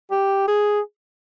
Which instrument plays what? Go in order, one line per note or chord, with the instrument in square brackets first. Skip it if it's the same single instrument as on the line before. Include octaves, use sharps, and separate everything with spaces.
[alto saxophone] G4
G#4